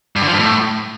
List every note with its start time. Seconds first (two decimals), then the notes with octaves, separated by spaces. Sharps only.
0.16 G2
0.22 D3
0.28 F3
0.33 G2
0.39 A2